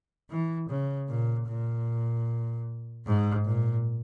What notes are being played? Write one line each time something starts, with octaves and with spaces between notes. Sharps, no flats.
E3
C#3
A#2
A#2
G#2
A#2